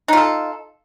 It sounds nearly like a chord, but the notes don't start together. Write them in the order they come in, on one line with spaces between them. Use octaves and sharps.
D#4 F4 A4